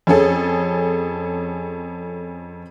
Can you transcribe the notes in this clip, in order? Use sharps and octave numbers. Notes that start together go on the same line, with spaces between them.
F2 C#4 G#4 A4